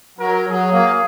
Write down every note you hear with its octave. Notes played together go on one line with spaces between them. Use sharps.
F#3 A#4
F#3 G#4
A#3